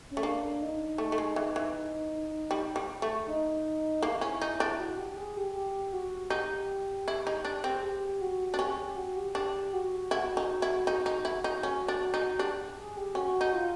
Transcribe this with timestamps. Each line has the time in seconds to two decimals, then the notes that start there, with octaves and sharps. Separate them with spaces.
0.11 C#4
0.17 A3
0.23 A#3 D4
0.62 D#4
0.98 A3
1.12 A3
1.18 G#3
1.36 E3
1.56 E3
2.51 G3
2.76 G3
3.02 A3
3.27 D#4
4.03 A#3 E4
4.21 C#4
4.42 D#4
4.60 D4
4.79 F#4
4.98 G4
5.09 G4
5.17 G#4
5.37 G4
5.54 G4
5.93 F#4
6.30 D#4 G4
7.08 E4
7.27 D#4
7.45 D4
7.64 C4
7.76 G#4
7.82 G4
8.21 F#4
8.50 D4 F#4
8.59 C#4 G4
8.78 G4
8.96 F#4
9.16 G4
9.35 D4 G4
9.73 F#4
10.11 E4 F#4
10.37 D#4
10.62 E4
10.87 D#4
11.06 D#4
11.25 E4
11.44 D#4
11.63 C#4
11.88 D4
12.14 D#4
12.29 F#4
12.38 D4 G4
12.77 G#4
12.97 G4
13.15 C#4 F#4
13.41 D#4
13.53 F4